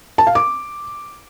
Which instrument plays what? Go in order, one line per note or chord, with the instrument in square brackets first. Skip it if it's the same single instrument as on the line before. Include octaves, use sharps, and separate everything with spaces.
[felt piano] A5
F5
D6